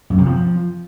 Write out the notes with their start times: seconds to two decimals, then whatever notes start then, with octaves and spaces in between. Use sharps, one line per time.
0.10 F#2
0.18 C3
0.26 F3